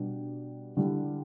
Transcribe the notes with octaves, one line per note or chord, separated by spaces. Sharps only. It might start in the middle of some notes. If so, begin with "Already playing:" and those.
Already playing: B2 G3 B3 D4 G4
D3 G3 E4